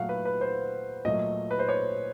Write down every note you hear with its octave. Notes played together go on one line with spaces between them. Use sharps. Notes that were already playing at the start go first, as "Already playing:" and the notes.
Already playing: A#2 F#3 A3 F5 F#5
B4
B4
C5
A#2 F#3 A3 D#5
B4
C5
C#5